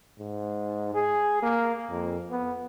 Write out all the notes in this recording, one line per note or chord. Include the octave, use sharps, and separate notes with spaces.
G#2
G#4
A#3
F2
B3